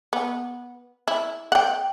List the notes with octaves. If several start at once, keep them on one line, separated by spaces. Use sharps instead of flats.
B3
E4
F#5 G5